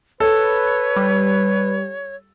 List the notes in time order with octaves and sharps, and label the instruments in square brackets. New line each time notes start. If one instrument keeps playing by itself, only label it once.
[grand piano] A4 [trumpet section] B4 [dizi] C#5
[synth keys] G3